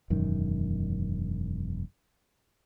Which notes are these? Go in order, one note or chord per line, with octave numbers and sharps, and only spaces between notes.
E1 F#2 D#3